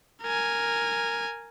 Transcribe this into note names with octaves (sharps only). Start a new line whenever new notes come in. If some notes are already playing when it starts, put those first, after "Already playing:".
A#4 G#5